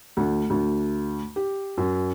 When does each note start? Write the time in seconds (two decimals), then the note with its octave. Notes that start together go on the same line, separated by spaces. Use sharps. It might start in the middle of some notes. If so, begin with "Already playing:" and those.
0.17 D2
0.50 D2
1.36 G4
1.78 F#2